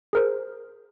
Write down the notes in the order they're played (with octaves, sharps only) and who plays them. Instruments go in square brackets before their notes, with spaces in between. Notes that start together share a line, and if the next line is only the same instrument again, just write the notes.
[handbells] G#4 A#4 C5